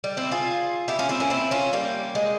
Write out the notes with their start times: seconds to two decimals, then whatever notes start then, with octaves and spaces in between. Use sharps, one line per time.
0.04 G3
0.17 C4 E4
0.31 F4 G#4
0.88 E4 G4
0.99 C#4 F4
1.09 C4 E4
1.20 A#3 C#4
1.30 C4 E4
1.51 C#4 F4
1.73 G3 A#3
2.15 G#3